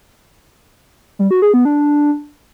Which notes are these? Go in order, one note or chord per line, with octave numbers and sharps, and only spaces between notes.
G3
F#4
G#4
B3
D4